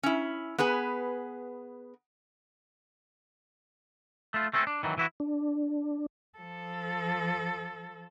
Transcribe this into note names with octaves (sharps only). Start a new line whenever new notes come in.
C#4 E4
B3 G#4 B4 G#5
A3 F4
A3 C4 C#4 A4
D4
D#3 E3 F#3
E3 E4 F#4
D4
F3 A4